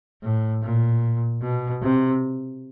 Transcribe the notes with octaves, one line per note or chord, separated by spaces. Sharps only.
A2
A#2
B2
C3